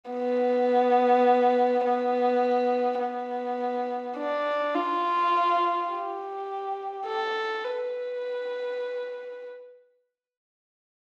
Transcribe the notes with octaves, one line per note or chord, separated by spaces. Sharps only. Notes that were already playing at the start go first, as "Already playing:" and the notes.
B3
B3
B3
D4
F4
G4
A4
B4